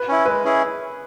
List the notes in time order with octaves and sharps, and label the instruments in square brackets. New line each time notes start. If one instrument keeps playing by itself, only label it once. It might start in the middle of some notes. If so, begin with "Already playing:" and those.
Already playing: [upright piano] B4
[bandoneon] C#4 E4
[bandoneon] G#3 [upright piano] B4
[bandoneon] C#4 E4 G#4